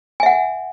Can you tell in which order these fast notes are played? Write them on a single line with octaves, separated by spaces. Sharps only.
G#5 E5 F#5